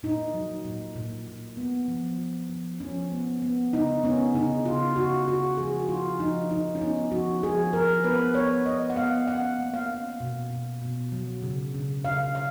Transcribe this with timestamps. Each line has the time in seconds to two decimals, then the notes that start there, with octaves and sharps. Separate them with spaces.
0.03 A#2 D#4
0.34 F#3
0.65 A#2
0.96 A#2
1.27 A#2
1.57 B3
1.88 F3
2.19 F3
2.49 F3
2.80 F3 C#4
3.12 B3
3.42 B3
3.73 C#3 D#4
4.03 B3 C#4
4.34 C#3 D#4
4.65 C#3 F4
4.96 C#3 F#4
5.28 C#3 F#4
5.57 F3 G#4
5.80 F#4
5.88 F3 F4
6.19 F3 D#4
6.50 F3 D#4
6.75 C#4
6.81 B3 D#4
7.11 F3 F#4
7.43 F3 G#4
7.73 F3 A#4
8.04 B3 B4
8.35 B3 C#5
8.66 B3 D#5
8.90 F#5
8.96 B3 F5
9.27 C#4 F#5
9.58 A#3
9.74 F5
9.88 C#4
10.20 B2
10.50 B2
10.82 B2
11.12 F#3
11.42 C#3
11.74 C#3
12.05 C#3 F5
12.35 C#3 F5